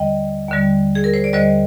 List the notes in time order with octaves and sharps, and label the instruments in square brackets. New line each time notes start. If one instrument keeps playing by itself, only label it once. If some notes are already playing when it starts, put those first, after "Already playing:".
Already playing: [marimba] D#2 D3 G3 D#5 G5
D#2 D3 G3
G#4
A#4
C5
D5
D#2 D3 G3 C5 D#5